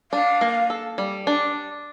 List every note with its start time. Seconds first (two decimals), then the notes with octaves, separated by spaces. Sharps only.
0.12 D4 F5
0.41 A#3
0.70 A4
0.98 G3
1.27 D4